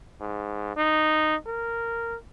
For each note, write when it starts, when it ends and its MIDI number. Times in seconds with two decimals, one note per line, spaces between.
0.21 0.76 44
0.77 1.35 63
1.46 2.15 70